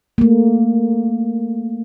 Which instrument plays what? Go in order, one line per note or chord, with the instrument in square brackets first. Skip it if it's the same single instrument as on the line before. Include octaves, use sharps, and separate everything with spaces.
[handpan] A3 A#3